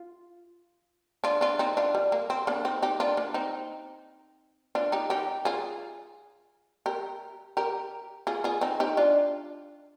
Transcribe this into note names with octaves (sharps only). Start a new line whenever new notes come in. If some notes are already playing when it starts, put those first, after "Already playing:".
Already playing: F4
D4 F4
D4 F4
C4 D#4
D4 F4
G3
A#3
C4
A#3 D4
C4 D#4
D#4 G4
D4 F4
A#3 D4
C4 D#4
D4 F4
D#4 G4
D#4 G4
F4 G#4
G4 A#4
G4 A#4
F4 G#4
F4 G#4
C4 D#4
D#4 G4
D4 F4